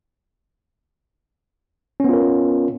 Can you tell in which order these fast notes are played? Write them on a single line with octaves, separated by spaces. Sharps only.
C#4 B3 F4 A#4